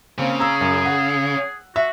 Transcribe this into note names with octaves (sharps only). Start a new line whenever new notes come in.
C#3 A#3 C4
G#4 A#5 E6
F#2
F#5
F#4 E5